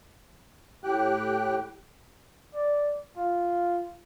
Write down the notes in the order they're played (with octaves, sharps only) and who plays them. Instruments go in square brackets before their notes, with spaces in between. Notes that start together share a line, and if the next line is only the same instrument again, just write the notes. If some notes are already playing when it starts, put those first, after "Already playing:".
[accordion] A2 G4 G5 F#6
[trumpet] D5
F4